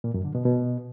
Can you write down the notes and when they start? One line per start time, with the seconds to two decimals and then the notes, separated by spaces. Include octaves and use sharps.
0.04 A#2
0.14 F#2
0.24 D3
0.35 B2
0.45 B2